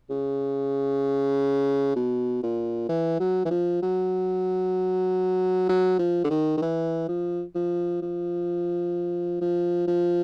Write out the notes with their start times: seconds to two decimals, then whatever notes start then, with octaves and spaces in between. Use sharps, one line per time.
0.10 C#3
1.96 B2
2.43 A#2
2.89 E3
3.20 F#3
3.45 E3
3.51 F3
3.82 F#3
5.69 F#3
5.99 F3
6.24 D3
6.30 D#3
6.57 D#3
6.62 E3
7.09 F3
7.55 F3
8.02 F3
9.41 F3
9.87 F3